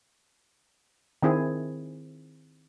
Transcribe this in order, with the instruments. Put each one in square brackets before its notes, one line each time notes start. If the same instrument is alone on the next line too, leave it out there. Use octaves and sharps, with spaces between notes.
[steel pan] D#3 C4 E4 G#4